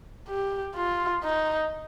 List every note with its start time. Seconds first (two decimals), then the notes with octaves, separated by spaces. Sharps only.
0.28 G4
0.75 F4
1.24 D#4